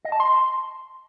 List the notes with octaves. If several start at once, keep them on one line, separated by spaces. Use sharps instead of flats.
D#5
A5
C6